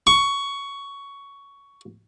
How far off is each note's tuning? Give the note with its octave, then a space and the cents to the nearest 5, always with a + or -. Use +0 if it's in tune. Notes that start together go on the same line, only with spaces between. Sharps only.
C#6 +10